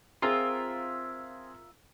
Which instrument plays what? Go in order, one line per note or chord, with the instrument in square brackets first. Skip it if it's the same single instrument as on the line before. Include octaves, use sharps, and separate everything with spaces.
[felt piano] C4 G#4 [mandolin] F4 A#4 E5